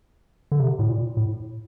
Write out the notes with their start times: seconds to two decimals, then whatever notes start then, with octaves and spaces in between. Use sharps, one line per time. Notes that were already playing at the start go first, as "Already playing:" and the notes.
0.52 D3
0.60 C3
0.79 A2
0.89 A#2
1.17 A2